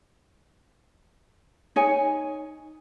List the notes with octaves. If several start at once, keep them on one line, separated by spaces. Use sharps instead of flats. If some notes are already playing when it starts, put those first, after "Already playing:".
D#4 C#5 G#5